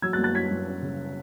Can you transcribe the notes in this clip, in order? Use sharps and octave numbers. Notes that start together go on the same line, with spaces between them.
F#3 E6 G#6
F#6 A6
F#2
F#6 A6
C#4 G#6 B6
F#2
C#4
C#3